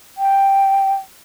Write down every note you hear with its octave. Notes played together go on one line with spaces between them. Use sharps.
G5